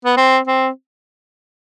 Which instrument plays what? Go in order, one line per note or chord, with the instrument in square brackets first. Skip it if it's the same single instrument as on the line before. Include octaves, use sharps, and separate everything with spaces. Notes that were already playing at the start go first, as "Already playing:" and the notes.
[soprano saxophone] B3
C4
C4